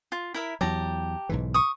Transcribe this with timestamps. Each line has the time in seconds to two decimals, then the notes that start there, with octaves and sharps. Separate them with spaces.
0.12 F4
0.34 E4 A#4 E5
0.61 E2 F#3 G4 A5 A#5
1.29 B1 G#2 E3
1.54 C#6 D#6